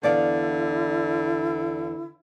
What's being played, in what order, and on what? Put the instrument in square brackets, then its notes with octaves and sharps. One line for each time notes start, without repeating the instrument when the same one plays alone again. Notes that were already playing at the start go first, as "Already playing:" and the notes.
[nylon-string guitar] E2 D5 F5 [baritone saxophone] D3 [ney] E4